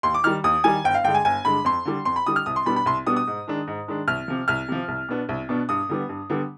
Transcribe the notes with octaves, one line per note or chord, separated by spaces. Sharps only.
D#2 C6
D6
D#3 G3 F6
D#2 D#6
D#3 G3 G#5
G1 G5
F5
G2 D3 G#3 G5
G#5
G1 G#5
G2 D3 G#3 B5
F2 C6
D3 G3
F2 C6
B5
D3 G3 D#6
F6
C2 D#6
C6
B2 G3 B3 D4 B5
B5
C2 C6
B2 G3 B3 D4 D#6
D#6
G#2
D#3 G#3 D4
G#2
D#3 G#3 D4
C2 F6
C3 F3
C2 F6
C3 F3
C2
B2 B3 D4
C2
B2 B3 D4
G2 D#6
D3 G3 B3
G2
D3 G3 B3